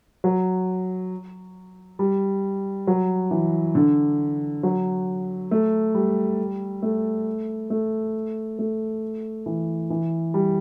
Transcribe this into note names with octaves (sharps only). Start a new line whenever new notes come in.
F#3
G3
F#3
E3
D3
F#3
A3
G3
A3
A3
A3
E3
E3
G3